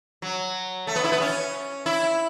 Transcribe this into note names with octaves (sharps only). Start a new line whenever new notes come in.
F#3
A3
B3
E4
B3
C#4
E4